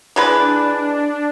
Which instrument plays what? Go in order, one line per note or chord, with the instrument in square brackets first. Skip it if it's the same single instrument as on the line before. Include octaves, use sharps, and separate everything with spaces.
[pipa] E3 G#3 B4 [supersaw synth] D4